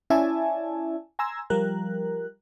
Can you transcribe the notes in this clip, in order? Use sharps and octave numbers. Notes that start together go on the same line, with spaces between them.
C#4 E4 D5 E5 G#5 A5
G#5 A#5 C6 E6 G#6
F3 G3 A#4 F#6